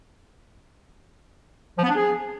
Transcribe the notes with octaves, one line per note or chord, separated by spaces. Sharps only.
F3
B3
D4
G#4